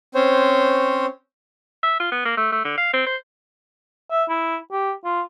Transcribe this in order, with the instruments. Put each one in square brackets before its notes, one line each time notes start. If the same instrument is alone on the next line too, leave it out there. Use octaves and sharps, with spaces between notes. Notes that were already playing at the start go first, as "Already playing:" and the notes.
[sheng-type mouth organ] C4 C#4 C5 C#5
[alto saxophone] E5
F4
B3
A#3
A3
A3
D3
F5
C4
C5
[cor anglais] E5
E4
G4
F4